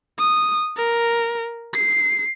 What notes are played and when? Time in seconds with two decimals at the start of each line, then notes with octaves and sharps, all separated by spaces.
0.19 D#6
0.77 A#4
1.74 C7